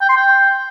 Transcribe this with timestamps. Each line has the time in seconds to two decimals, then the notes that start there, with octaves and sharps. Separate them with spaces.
0.01 G5
0.09 C6
0.17 G5